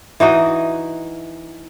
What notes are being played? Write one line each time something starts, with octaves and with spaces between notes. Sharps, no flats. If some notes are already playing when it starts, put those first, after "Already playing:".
E3 D#4 F#4 D#5